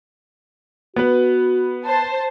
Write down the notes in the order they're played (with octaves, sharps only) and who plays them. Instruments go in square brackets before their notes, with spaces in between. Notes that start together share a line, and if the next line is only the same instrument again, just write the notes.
[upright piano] B3 B4 [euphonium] F#4
[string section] C5 A5